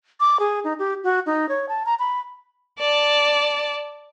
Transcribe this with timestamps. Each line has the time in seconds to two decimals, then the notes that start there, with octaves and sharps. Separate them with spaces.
0.20 D6
0.40 G#4
0.64 D#4
0.79 G4
1.04 F#4
1.26 D#4
1.49 C#5
1.69 A5
1.86 A#5
1.99 B5
2.79 D5 A5